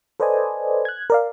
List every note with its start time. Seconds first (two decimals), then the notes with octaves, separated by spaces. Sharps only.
0.20 A4 B4 C5 D5 D#5 G#5
0.85 F#6 G#6
1.10 A#4 D5 F5